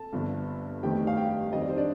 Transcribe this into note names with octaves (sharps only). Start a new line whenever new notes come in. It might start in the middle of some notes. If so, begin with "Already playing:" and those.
Already playing: A4 A5
G1 G2 D3 F3
G1 F2 D#3 A3 C4 G4 G5
F5
G4 G5
F2 D#3 G3 C4 D#5
D5
C5
D4 D5